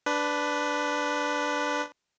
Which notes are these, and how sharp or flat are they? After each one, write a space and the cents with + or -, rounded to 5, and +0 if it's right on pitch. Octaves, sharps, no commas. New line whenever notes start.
D4 +0 B4 +10